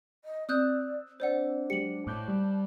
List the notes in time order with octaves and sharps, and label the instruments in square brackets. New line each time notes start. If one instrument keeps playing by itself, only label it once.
[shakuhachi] D#5
[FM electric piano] C4 E6 [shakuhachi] D5 [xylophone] D#6 F#6 G6
[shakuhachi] D4 [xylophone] C5 D5 F#5
[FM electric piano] F#3 G#3 G4 [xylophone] C#7 F#7
[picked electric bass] A2 [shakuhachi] A5 [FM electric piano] D6 F#6 G6
[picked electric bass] G3